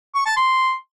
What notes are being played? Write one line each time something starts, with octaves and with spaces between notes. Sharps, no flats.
C#6
A5
C6